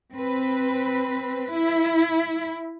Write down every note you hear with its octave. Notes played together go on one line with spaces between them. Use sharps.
C4 B4
E4